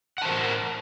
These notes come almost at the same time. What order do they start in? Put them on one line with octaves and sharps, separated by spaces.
F#5 A5 C5 A#4